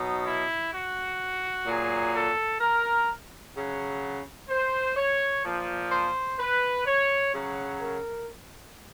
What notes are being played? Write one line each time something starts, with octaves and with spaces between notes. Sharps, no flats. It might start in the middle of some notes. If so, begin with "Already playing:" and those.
Already playing: B2 F#3 D#4
E4
F#4
A#2 F#3 G#4
A4
A#4
C#3 F#3
C5
C#5
A#2 F3
C5
B4
C#5
C#3 F#3
A#4